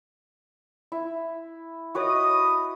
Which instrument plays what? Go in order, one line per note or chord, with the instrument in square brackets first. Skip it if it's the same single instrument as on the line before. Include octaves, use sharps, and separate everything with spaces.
[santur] E4
[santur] F#4 B4 C#5 [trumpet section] D#5 D#6